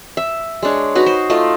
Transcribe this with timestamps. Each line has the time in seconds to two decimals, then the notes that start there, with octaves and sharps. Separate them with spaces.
0.17 E5
0.63 G#3 D4 C#5
0.95 D#4 F#4 B4
1.06 C5
1.30 A3 F4 D#5